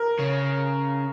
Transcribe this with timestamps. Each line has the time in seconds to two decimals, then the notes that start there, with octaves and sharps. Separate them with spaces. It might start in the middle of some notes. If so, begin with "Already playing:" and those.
Already playing: A#4
0.19 C#3